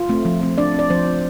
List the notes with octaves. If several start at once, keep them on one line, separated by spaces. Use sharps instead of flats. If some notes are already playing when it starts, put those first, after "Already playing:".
Already playing: F4
A3 C4
F3
A3 C4
F3 D4 D5
C4 D5
F3 C4 C5
C4